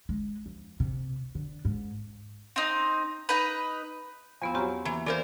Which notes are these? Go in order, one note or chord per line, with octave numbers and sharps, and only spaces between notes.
G#3
F2
C3
D3
G#2
C4 D#4
D#4 B4
E2 F3 B3 C4
F#3 C4 C#4 G4 A#5
E3 A#3
E3 A#4 C5 D5 F5